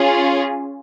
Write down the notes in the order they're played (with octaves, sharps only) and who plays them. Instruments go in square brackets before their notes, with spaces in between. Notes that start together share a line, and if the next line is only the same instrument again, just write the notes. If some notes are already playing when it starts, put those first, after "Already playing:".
Already playing: [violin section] C#4 F4 G#4